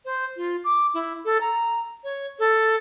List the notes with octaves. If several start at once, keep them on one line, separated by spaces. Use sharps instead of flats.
C5
F4
D6
E4
A4
A#5
C#5
A4